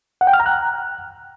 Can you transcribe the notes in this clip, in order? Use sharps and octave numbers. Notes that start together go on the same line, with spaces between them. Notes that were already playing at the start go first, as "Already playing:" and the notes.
F#5
G5
F6
A#5
F#6